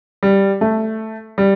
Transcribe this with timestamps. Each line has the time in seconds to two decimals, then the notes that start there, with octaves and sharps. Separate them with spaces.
0.23 G3
0.61 A3
1.38 G3